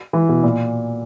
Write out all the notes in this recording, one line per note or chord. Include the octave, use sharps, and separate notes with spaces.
E3
B2
A#2